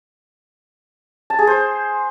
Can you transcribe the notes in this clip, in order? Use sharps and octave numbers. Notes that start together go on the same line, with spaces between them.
A5
G#4
C5